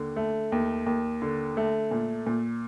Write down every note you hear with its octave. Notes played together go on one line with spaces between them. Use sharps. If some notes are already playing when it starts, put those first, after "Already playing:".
Already playing: D#2 D3
A3
D#2
D#2
D3
A3
A#2
A#2